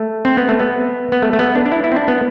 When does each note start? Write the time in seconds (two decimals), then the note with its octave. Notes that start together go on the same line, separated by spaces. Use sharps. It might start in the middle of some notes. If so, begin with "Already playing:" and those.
Already playing: A3
0.25 C4
0.37 B3
0.49 A3
0.59 B3
1.12 B3
1.22 A3
1.33 A3
1.39 B3
1.55 D4
1.66 D4
1.72 E4
1.84 E4
1.92 C4
1.96 D4
2.08 B3